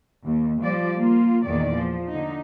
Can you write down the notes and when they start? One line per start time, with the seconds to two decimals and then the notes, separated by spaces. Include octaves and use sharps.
0.25 D#2
0.62 F3 G3 D5
0.98 A#3 F4
1.46 E2 A#2 D#3 D5
1.75 F3
2.09 D3 D#4